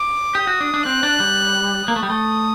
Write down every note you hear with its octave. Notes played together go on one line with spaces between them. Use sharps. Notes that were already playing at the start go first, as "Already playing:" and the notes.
Already playing: D6
G4 D#6
F#4
D4
D4
C4 F#6
D4
G3
A#3 D#6
A3
G3
A3